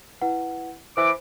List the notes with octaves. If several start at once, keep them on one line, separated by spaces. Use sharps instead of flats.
E4 B4 F#5
E3 C5 D6